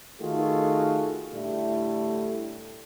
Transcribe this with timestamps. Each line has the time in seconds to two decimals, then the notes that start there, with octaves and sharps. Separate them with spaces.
0.21 D#3 A3 F4 F#4 G#4 A4
1.34 A2 D3 G3 A3 E4